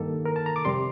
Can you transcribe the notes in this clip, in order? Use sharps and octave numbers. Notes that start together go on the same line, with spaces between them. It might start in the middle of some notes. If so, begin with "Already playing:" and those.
Already playing: G2 D#3 A#3 A4
A#4
A5
A#5
D6
F2 C3 G3 C6